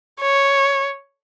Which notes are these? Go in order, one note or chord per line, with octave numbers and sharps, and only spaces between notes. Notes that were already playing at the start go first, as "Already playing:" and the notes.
C#5